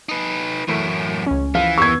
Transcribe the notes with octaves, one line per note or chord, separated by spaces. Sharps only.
D#4 B4
F#2 A2 E3 A3 A#4
C#2 C#4
E3 F3 F5
D#2 B3 C#6 E6 G#6